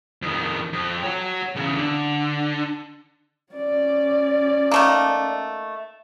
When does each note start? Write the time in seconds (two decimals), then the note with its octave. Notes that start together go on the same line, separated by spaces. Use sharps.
0.22 F2 D#3
0.73 F2
1.03 C#5 F#5
1.56 E2 C#3
1.77 D3
3.53 C#4 D5
4.71 D#3 A3 A#3